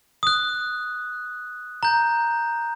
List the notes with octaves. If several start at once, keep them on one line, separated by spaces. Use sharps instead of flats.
D#6 F#6
A#5 G6